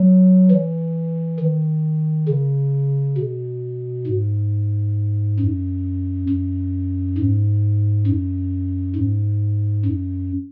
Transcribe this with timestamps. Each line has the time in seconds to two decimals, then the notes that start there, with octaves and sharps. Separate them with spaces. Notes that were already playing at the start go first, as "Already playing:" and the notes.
Already playing: F#3
0.50 E3
1.39 D#3
2.28 C#3
3.17 B2
4.06 G#2
5.39 F#2
6.29 F#2
7.18 G#2
8.07 F#2
8.95 G#2
9.85 F#2